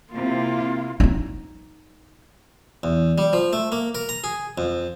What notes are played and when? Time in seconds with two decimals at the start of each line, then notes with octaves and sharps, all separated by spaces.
0.13 C3 A#3 E4 F4
1.00 D#4 E4
2.83 E2
3.18 G3
3.33 F3
3.53 A3
3.72 A#3
3.95 A#4
4.09 A#5
4.24 G#4
4.58 F2